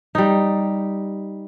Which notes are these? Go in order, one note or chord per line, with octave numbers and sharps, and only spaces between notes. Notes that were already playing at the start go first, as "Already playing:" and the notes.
G3 D#4